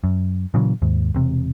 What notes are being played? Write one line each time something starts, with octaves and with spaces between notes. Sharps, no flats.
F#2
A#2 C#3 E3 F#3
D#2 G#2
E1 C3